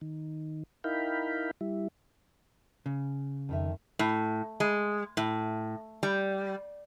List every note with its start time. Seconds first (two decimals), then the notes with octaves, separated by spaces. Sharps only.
0.01 D#3
0.84 D#4 E4 A#4 F5 G5 B5
1.61 G3 E4
2.86 C#3
3.49 F2 D#3 E5
3.99 A2
4.60 G#3
5.17 A2
6.03 G3